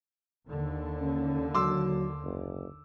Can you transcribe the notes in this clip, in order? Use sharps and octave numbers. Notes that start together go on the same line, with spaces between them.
D#2 D3
C#4
F#3 C6 D6 E6
F#1